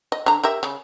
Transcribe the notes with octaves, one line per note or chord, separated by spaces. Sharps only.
D#5
D3 A#5
G4 A#4 E5
C#3